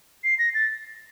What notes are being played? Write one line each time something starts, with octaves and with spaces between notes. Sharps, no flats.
C7
A#6
A6